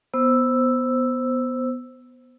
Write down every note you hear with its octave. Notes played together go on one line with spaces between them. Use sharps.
B3 C5 E6